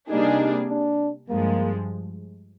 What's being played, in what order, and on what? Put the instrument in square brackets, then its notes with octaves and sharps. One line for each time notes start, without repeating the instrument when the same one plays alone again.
[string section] C3 G3 A#3 D4 G#4 [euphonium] D#4
[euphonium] D4
[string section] G2 F3 G#3 [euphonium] A#3